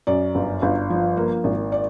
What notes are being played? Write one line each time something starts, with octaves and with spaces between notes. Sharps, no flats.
F#2 D5
G1
G1
F3
A#3
G#1
D5